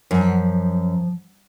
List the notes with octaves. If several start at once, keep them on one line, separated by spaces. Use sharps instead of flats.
F#2 F3